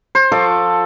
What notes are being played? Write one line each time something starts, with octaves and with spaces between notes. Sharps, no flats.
C5
F3 A4 C#6 D6